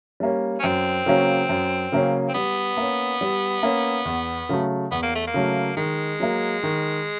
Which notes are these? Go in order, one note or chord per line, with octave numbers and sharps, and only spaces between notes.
G3 A#3 C#4
C#4
F#2 C4
C#3 F#3 A#3 C#4
F#2
C#3 F#3 A#3 C#4
C4
G3 B3
A#3 C#4
G3
A#3 C#4
E2
C#3 F#3 A3
E2 B3
A#3
A3
A#3
C#3 F#3 A3
D#3 G#3
F#3 A#3
D#3